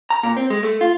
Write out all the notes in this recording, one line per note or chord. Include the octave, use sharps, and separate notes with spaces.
A#5
A#2
C4
G#3
A3
F4